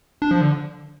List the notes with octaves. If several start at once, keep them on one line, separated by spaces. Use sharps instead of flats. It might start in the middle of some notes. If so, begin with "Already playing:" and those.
D4
F3
D3